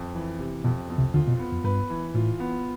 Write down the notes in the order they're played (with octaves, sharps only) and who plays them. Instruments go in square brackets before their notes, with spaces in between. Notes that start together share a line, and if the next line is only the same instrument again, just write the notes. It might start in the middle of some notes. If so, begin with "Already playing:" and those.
Already playing: [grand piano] F2
E3
C3
[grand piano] F2 [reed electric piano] B2
[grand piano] F2
[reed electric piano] C2 C3
[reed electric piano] D2 D3 [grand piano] F4
[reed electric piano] B2
[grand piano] B3
[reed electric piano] F2
[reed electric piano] G2 [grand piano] B4
[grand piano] E3
[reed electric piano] A2 [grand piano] F4
[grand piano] B3